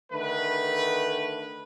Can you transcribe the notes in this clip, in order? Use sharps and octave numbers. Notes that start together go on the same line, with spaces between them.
D3 D#3 A3 B4